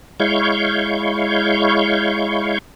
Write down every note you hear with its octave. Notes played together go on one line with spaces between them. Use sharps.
G#3 E4 C#5 F5 C#6 G6